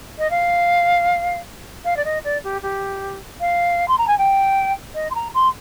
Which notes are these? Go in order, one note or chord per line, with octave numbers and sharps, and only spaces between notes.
D#5
F5
F5
D5
D#5
D5
G4
G4
F5
C6
A#5
G#5
G5
D#5
C6
A#5
C6